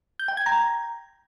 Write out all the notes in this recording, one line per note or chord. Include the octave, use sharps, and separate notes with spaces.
G6
G5
G#6
A#5